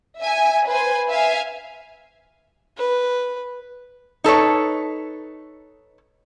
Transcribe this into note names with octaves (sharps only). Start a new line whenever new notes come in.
E5 G#5
B4 C5 G#5
E5 F5 G#5
B4
D#4 A4 B4 C#5